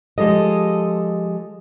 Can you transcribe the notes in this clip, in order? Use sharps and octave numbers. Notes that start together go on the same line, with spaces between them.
F3 G#3 G4 A4 D#5